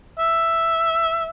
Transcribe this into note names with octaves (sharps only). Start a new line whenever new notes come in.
E5